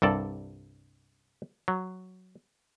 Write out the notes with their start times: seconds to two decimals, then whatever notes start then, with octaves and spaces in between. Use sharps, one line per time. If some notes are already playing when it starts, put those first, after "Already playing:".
0.02 C2 G2 A4 D5
1.68 F#3